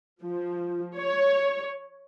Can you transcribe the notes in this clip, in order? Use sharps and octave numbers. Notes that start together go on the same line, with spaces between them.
F3
C#5